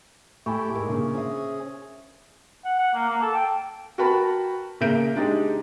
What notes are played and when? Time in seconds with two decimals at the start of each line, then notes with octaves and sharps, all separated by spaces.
0.46 A2 A3 G4 G#5 B5 C#6
0.75 G#2 A#4 G#5
0.88 A#2 C#3 A#3 D4 C#6
1.15 C#4 G#4 C5 E5
2.65 F#5
2.79 F#5
2.94 A#3
3.09 A#3
3.22 A4
3.34 G5
3.98 F#4 A#4 B4 G5 A5 B5
4.80 A#2 C#3 A#4 E5 G6 D7
5.16 G#3 D4 D#4 G4 G#4